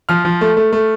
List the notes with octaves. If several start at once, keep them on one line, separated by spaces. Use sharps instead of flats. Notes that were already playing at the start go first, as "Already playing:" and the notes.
F3 F6
F3
A3
A3
A3